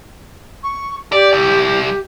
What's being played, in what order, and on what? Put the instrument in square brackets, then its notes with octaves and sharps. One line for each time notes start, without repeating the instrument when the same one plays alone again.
[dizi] C#6
[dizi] G4 [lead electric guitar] D5
[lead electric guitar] C2